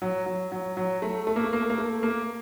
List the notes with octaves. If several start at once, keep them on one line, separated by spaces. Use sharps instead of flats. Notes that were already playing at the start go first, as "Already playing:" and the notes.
F#3
F#3
F#3
F#3
A3
A3
A#3
A3
A#3
A3
A#3
A3
A#3